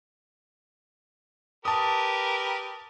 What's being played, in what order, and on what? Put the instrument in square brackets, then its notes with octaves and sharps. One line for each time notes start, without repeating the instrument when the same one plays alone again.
[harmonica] G4 A#4 B4 [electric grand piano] A5 D#6